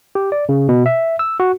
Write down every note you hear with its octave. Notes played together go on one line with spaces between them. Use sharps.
G4
D5
C#3
B2
E5
E6
F#4